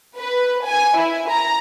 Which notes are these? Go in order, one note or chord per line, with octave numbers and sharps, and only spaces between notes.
B4
G#5
E4
A#5